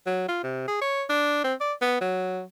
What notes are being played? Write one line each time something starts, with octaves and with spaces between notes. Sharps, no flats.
F#3
F4
C3
G#4
C#5
D4
C4
D5
B3
F#3